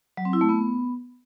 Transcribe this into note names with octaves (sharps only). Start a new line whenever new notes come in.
F#3
C4
E4
A3
B3